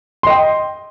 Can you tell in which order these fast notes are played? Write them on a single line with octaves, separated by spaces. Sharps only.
C6 D#5 G5